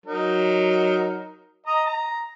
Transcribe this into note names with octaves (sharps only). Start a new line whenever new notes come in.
F#3 D#4 A#4
D#5 A#5 D#6
A#5